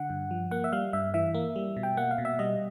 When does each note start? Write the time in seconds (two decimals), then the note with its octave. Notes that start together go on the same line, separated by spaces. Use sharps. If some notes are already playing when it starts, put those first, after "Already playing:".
Already playing: D3 F#5
0.10 G2
0.31 F3
0.51 A#3 F#5
0.64 E5
0.72 G3 F5
0.93 G2 E5
1.14 E3 E5
1.35 A#3
1.56 G3
1.76 B2
1.83 G5
1.97 A#3 F#5
2.11 F5
2.18 B2
2.25 E5
2.39 G3 D#5